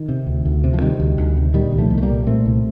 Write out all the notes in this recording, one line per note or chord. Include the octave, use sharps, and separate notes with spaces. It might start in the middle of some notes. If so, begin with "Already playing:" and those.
Already playing: D#3
C3
D2
D2
C3
F3
C3 D#3 G3
D2
D2
C3
A#2 D#3 G3
C2
F3 A3
C2
A3
G3 A#3
A#2
A#2 A3 C4
C2